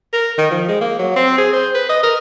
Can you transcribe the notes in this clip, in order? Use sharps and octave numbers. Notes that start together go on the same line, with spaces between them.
A#4
D#3
F3
G#3
A#3
F#3
C4
G#4
C5
B4
D#5
A#4